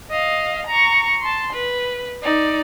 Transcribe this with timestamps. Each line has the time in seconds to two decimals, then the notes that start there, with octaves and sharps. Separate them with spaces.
0.10 D#5 F5
0.67 A#5 C#6
1.21 A5 C6
1.52 B4
2.22 D#4 D5